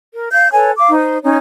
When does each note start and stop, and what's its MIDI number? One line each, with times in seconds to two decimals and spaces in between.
0.13 0.28 70
0.32 0.51 77
0.32 0.51 91
0.52 0.70 69
0.52 0.70 71
0.52 0.70 73
0.52 0.70 80
0.76 0.90 77
0.76 0.90 86
0.90 1.19 63
0.90 1.19 72
1.23 1.38 61
1.23 1.38 63
1.23 1.38 73